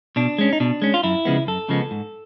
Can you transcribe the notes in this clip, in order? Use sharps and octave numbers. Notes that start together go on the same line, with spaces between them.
B2 D4
G#3 C#4
D#4
B2 D4
G#3 C#4
F4
F#2 E4
C#3 F3 G#3 B3
F#2 A4
C#3 F3 G#3 B3
G#2